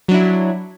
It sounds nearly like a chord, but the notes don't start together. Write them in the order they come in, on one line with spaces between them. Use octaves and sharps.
F#3 D4 E4